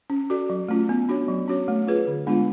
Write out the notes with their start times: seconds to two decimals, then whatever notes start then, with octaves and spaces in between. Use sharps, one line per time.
0.10 C#4
0.30 F#4 A4 D5
0.50 F#3
0.69 A3 C#4 F4
0.89 B3
1.09 D4 F#4 C#5
1.28 F#3
1.48 C#4 F#4 C#5
1.68 A3
1.87 F4 G#4 B4
2.07 D3
2.27 G#3 B3 D4 F4